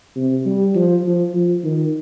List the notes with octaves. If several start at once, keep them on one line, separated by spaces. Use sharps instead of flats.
C3
G3
F3
F3
F3
D#3